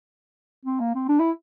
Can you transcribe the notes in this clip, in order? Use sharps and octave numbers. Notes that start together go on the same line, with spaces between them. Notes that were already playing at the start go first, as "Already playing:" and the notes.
C4
A#3
C4
D4
E4